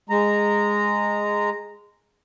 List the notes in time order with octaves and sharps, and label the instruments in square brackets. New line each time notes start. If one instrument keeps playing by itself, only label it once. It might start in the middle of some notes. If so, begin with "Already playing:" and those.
[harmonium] G#3 A#5